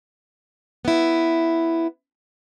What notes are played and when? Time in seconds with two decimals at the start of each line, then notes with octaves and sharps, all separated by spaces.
0.85 B3 E4